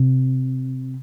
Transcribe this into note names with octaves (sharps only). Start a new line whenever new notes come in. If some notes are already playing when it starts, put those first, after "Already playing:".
Already playing: C3